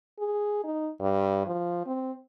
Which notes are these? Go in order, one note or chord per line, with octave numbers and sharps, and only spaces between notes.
G#4
D#4
G2
F3
C4